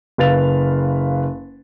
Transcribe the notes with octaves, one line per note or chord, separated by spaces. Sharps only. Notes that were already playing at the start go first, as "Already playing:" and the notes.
F#1 B4 F5 A6 F7